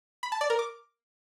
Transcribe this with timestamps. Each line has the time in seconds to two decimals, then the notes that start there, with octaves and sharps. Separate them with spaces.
0.23 B5
0.32 A5
0.41 D5
0.50 A#4
0.59 D6